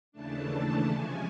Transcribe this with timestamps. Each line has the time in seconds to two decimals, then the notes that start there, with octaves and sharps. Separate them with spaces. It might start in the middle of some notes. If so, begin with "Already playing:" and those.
0.12 D#2 C#3 E3 A3 D4 A5
0.50 A5
0.87 C3 F3 G#3 C#4 G#5